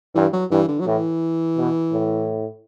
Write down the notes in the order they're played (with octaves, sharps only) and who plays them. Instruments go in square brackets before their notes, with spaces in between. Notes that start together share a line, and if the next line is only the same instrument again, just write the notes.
[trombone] G2 [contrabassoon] E3
[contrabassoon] F#3
[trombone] G2 [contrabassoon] E3
[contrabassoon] D3
F#3
[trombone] A2 [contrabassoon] E3
[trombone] B2
A2